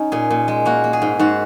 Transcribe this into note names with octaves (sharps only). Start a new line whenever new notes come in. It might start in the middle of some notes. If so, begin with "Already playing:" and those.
Already playing: C#4 D#4
A#2 G#4
A#2
G#3
A#3 F#4
A#3
G#4
G#2
G#2 F#4